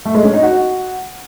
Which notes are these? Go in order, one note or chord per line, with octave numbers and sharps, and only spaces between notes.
A3
G#3
C#4
D#4
F#4